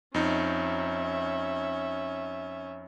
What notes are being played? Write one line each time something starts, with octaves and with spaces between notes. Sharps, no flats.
F2 C#4 D#4 E5